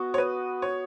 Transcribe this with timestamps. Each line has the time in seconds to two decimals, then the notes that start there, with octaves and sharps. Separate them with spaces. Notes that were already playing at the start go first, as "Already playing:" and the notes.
Already playing: B3 F#4 D#5
0.14 C#5
0.18 B4
0.62 C#5